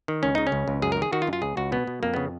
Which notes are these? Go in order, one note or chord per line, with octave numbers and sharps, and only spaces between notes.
D#3
C#2 C#4
C#3 D#4
C#4
C#2
C#2
F#2 G#4
A#4
D#3 G#4
D#3 F#4
F4
F#2
F4
C#2 G#4
C#2 F#4
B2 B3
B2
F2 A#3
C#3 B3